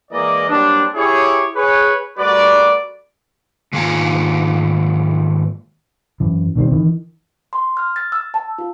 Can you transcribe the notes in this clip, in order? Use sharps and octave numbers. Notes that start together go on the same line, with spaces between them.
E3 G#3 A#3 A#4 D5 D#5
F#3 G3 A#3 C4 D4
E4 G4 G#4 C#5
G#4 B4 C#5
G3 A3 F#4 A#4 B4 D5
G#2 D#3 A#3 F4 G#5 A#5
F#2 E3
B2 D#3 G3 C4
D#3 E3
C6
F6
A6
E6
A5
F4